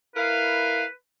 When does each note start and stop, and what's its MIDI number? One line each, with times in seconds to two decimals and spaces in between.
0.15 0.84 64
0.15 0.84 70
0.15 0.90 71
0.15 0.84 77